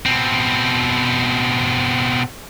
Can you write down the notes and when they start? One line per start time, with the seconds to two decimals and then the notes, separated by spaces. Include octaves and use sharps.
0.06 B2 C4